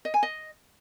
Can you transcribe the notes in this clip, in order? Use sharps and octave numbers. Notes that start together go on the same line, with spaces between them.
D#5
G#5
D#5